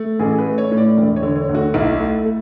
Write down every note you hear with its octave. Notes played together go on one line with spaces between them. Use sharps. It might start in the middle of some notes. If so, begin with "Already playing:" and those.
Already playing: A3
A1 G#4
B4
A3
C#5
A2
D5
E1
C#5
D3
C#5
D2
F#4
B1 E4
A3
A3